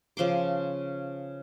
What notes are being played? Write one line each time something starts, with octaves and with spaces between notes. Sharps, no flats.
C#3 F3 C6 D6